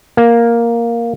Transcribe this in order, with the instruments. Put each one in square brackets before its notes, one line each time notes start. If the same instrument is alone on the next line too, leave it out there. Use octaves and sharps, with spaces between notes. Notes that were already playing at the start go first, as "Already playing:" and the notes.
[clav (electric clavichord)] A#3